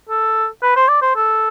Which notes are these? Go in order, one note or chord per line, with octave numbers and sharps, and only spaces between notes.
A4
B4
C5
D5
C5
A4